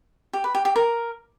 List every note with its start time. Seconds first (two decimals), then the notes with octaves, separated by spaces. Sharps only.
0.33 G4
0.44 B4
0.55 G4
0.65 G4
0.76 A#4